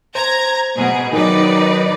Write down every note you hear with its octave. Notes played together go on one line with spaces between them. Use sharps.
C5 A#5 G#6
B2 G#4
D#3 F#3 D#4 B4 D5